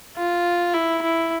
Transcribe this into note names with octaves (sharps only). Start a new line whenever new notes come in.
F4
E4
E4